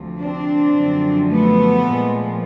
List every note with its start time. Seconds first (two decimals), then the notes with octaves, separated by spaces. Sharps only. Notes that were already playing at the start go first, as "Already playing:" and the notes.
Already playing: D2 C3 F3
0.19 C4 D4
0.74 F#2 D3 F3
1.29 A3 B3
1.84 A#2 F3 G#3